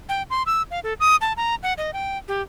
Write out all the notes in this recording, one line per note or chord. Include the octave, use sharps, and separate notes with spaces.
G5
C6
E6
F5
A4
D#6
A5
A#5
F#5
D#5
G5
G4